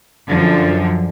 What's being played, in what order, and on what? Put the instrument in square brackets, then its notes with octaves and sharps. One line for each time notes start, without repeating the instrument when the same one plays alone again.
[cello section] F#2 D3 F3